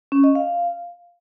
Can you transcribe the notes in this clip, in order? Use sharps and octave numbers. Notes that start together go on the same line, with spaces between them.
C#4
D#5
F5